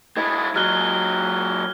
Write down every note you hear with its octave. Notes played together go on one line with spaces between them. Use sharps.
G#3 E4 G#6
F#3 G#3 F6 F#6 G7